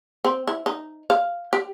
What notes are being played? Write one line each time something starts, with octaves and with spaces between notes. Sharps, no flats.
C4
E4
D#4
F5
G4